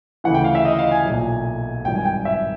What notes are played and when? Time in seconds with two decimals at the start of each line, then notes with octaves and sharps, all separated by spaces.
0.24 D2 C#3 E3 F#5
0.34 G5
0.44 F5
0.55 E5
0.65 D#5
0.78 F5
0.91 G#5
1.05 B1 A#2 F#3
1.85 G#1 G2 D#3 F#3 G5
1.95 G#5
2.05 G5
2.25 E5